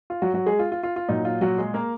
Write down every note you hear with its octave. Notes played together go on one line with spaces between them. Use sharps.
F4
F#3 F#4
F#3 F#4
G#3 G#4
F4
F4
F4
F4
A#2 F#3 D#4
F4
F#3 F#4
G#3 G#4
A#3 A#4